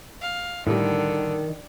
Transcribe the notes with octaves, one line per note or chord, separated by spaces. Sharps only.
F5
A2 D3 D#3 G3 E4